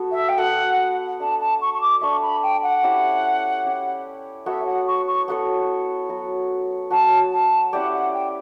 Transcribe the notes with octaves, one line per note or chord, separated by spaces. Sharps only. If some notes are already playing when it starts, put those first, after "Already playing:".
Already playing: B3 F#4 A4
E5
G5
B3 F#4 A4 F#5
D4 A4 E5 A5
A5
C#6
C#6
D6
D4 A4 E5 C#6
B5
G5
F#5
C#4 E4 G4
C#4 E4 G4
B3 F#4 A4 C#5 E5
F#5
C#6
C#6
B3 F#4 A4 C#5
F#3 B3 F#4
F#3 B3 F#4 A5
A5
C#4 E4 G4 D5 F#5
F#5
G5